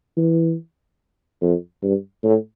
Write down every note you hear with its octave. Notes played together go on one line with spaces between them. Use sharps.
E3
F2
G2
A2